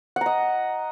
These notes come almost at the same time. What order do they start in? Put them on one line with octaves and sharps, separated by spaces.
F#5 A#5 D#5